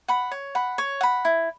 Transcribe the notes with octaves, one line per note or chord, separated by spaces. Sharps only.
F#5 B5
C#5
F#5 B5
C#5
F#5 B5
E4